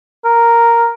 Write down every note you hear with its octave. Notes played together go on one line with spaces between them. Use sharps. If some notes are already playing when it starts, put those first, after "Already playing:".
A#4